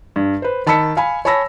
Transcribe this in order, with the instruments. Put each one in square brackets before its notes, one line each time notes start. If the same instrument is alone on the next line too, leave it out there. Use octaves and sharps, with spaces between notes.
[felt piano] G2
B4 C5
D#3 A5 B5 E6 B6 C#7
F5 G#5 B5
C#5 G#5 A5 B5 E6 A#6